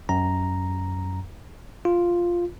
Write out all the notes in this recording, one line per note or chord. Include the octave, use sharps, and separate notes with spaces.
F#2 A#5
F4